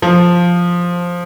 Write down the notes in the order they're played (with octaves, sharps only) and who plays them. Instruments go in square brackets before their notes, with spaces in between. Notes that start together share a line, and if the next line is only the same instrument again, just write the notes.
[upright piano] F3